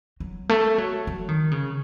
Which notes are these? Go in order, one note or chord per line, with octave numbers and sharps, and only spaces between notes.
F#3
A3
F#3
F#3
D#3
C#3